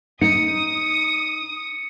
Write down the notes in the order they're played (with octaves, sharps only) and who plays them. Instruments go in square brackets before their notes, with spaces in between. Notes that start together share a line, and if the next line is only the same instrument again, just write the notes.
[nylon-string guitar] D#4 [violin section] D#6 [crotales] C#7